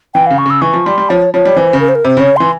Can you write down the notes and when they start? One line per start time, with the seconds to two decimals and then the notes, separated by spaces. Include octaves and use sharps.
0.14 E3 G5
0.26 C#3 F5
0.38 C#6
0.46 C#3 E6
0.61 E3 C#6
0.73 F3
0.85 G3 C6
0.98 G3
1.10 F3 C#5
1.34 F3 C#5
1.45 G3
1.57 E3 C5
1.73 C#3
1.80 A#4
1.89 C5
1.95 A#4
2.04 C3 C5
2.17 C#3 C#5
2.37 E3 C6